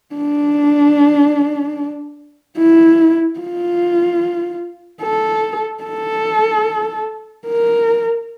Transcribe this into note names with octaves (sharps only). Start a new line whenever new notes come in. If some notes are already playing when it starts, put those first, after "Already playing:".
D4
E4
F4
A4
A4
A#4